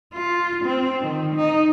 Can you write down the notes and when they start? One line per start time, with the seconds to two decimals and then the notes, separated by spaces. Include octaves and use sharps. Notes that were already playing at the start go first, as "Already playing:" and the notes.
0.13 F4
0.65 C4
1.01 D#3
1.36 D#4